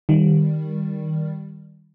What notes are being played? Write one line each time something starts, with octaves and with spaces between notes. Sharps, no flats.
D#3 G3